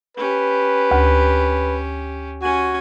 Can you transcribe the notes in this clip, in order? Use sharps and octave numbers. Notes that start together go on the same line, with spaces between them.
C#4 G4 B4
D2
C#4 F#4 G#5